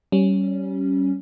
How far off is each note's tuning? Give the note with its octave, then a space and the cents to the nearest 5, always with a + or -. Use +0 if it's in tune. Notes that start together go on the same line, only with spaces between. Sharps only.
G3 -25 C#4 +0